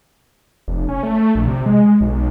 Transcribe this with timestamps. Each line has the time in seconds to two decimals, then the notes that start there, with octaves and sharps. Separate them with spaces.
0.68 F1
0.89 C#4
1.03 A3
1.35 A#1
1.48 C3
1.66 G#3
2.01 B1